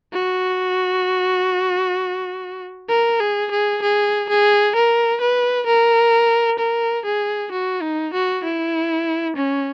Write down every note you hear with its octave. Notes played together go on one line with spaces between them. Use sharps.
F#4
A#4
G#4
G#4
G#4
G#4
A#4
B4
A#4
A#4
G#4
F#4
D#4
F#4
E4
C#4